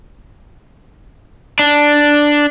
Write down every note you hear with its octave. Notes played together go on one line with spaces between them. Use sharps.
D4